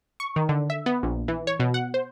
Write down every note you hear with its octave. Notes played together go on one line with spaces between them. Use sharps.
C#6
D#3
D3
E5
B3
A#1
E3
C#5
B2
F#5
C5